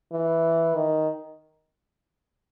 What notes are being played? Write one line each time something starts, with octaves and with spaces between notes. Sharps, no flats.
E3
D#3